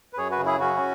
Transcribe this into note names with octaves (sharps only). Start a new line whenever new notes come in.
B4
F#2 G#4 C#5
F#4 B4
C#3
E4 G#4
F#2 C#4 F#4